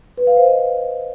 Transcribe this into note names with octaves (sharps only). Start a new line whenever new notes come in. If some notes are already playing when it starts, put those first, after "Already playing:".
B4
F5
C5
D#5